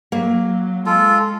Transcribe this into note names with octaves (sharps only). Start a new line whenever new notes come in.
F#3 A#3
G#3 F4 A4